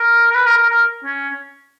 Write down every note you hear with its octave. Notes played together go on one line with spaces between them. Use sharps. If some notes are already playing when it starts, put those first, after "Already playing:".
Already playing: A#4
A#4
B4
A#4
A#4
A#4
C#4